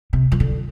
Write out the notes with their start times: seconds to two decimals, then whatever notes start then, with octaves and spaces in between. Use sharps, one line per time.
0.13 C3
0.32 F3
0.40 D3